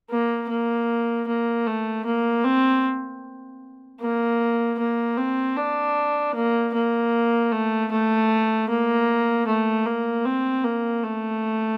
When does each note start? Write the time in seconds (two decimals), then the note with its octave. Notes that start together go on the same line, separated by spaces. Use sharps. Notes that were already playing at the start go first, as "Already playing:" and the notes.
0.10 A#3
0.49 A#3
1.27 A#3
1.66 A3
2.05 A#3
2.44 C4
4.00 A#3
4.79 A#3
5.18 C4
5.56 D4
6.35 A#3
6.74 A#3
7.52 A3
7.91 A3
8.69 A#3
9.47 A3
9.86 A#3
10.25 C4
10.64 A#3
11.03 A3